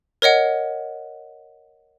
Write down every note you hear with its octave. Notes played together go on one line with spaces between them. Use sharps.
A#4 C#5 D#5 F#5